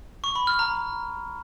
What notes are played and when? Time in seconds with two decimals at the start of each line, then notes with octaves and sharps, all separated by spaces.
0.24 C#6
0.35 B5
0.47 F6
0.59 A#5